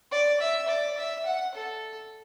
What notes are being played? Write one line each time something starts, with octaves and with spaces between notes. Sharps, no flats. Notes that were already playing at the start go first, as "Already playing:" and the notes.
D5
E5
D5
E5
F#5
A4